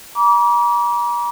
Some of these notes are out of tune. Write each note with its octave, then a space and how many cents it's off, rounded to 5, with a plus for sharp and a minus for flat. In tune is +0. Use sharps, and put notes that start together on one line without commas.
A#5 +45 D6 -25